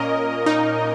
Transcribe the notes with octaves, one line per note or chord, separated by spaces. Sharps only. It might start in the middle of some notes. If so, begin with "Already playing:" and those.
Already playing: A#2 A#3 C#4 A#4 D#5
D#4